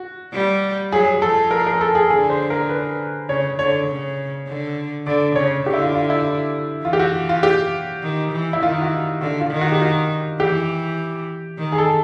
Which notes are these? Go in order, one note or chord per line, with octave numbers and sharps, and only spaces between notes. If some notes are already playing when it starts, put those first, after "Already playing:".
Already playing: F#4
G3
F#3 G#4
F3 A4
A#4
A#4
A4
G#4
D3 G#4
C5
A#4
B4
C#3 C#5
D3 C#5
C#3
D3
D3 D5
C#3 C#5
D3 G4
E4
F4
F4
E4
E3 F4
G4
F#4
F4
G4
D#3
E3
E4
D#3 F4
F#4
D3 F#4
F4
D#3
F#4
G4
F#4
E3 G4
D#3
G#4
A4